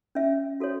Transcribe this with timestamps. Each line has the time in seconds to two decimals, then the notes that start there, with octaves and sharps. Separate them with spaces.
0.15 C#4 E5
0.60 F#4 A4 C#5